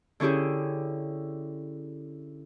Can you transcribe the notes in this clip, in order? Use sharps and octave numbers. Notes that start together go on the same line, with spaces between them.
D3 C#4 E4 G4 G#4